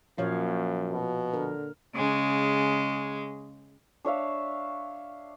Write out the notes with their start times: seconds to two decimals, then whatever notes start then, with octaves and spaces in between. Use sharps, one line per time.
0.18 F#2 A#2 F3 C#5 F5
0.91 B2
1.34 D3 A#4
1.94 C#3 G#3
4.05 D4 C#5 E5 F5